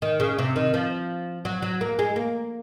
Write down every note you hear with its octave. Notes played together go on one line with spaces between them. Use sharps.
D#3
C#3
C3
D#3
F3
F#3
F#3
A#3
G#3
A#3